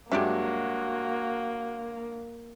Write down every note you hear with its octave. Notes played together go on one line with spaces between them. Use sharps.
G2 F#3 G#3 A#3 F#4 G4 D5 E5